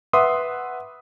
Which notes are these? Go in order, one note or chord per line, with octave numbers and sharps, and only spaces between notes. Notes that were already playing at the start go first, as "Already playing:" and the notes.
B4 E5 F#5 C6 D6 D#6